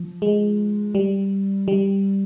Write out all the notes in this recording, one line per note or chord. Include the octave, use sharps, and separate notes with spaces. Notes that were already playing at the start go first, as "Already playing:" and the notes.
Already playing: F3
G#3
G3
G3